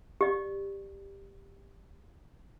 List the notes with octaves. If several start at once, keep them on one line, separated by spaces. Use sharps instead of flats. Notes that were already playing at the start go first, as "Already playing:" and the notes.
G4 D5